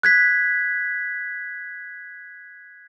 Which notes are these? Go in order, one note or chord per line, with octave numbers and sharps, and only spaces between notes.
F#6 G#6 B6